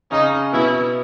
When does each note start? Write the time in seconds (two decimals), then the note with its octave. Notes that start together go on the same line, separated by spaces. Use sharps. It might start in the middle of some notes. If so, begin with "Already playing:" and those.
0.11 C#3 C#4 D#4
0.53 B2 B3 E4